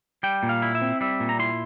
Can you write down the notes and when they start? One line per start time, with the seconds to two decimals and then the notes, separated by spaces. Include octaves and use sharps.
0.23 G3 G5
0.43 A#2
0.49 F5
0.62 E4
0.75 E5
0.82 C4
1.01 G3 E5
1.20 A#2
1.29 A#5
1.39 E4 C6